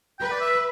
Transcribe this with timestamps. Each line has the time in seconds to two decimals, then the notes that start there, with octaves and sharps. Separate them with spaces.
0.19 B4 G5
0.31 D5
0.41 E5